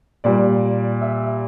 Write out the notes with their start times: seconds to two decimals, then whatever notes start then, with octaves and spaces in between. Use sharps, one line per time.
0.24 A#2 G3 D5
1.02 E5